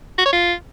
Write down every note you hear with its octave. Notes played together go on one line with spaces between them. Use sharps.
F#4
C#5
F4